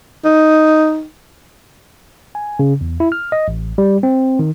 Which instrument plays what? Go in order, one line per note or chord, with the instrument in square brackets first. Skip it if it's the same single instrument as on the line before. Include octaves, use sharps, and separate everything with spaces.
[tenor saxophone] D#4
[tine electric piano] G#5
C#3
E2
E4
F6
D#5
A1
G3
C4
D#3